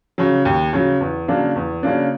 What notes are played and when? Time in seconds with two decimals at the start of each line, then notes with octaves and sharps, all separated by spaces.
0.18 C#3 F#3
0.45 D#2
0.73 C#3 F#3
1.00 E2
1.28 C#3 F#3 A#3 D4
1.56 E2
1.83 C#3 F#3 A#3 D4